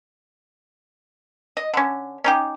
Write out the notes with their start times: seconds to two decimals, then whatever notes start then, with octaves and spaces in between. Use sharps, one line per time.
1.57 D#5
1.74 D3 C#4
2.24 C#4 D#4 G4